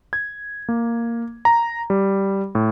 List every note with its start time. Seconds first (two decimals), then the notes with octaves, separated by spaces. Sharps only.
0.13 G#6
0.69 A#3
1.45 A#5
1.90 G3
2.55 A2